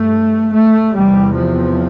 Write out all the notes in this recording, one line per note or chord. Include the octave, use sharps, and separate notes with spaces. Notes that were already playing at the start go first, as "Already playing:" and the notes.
Already playing: G2 A3
A3
E2 C3 G3
F3